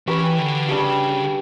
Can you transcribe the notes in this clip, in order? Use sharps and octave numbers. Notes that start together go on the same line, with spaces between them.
E3 C#4 G4 B4
D3
C#3 G3 D4 G4